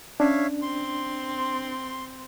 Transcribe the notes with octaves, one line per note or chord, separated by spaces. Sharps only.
C#4 D4 C#5 E5 F5
C4 C6